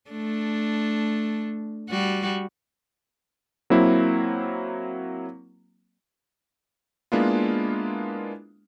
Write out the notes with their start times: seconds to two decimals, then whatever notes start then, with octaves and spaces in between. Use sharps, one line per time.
0.11 A3 D4
1.90 G3 F#4
3.70 F#3 A#3 C4 E4
7.12 G#3 A#3 B3 D4 E4 F4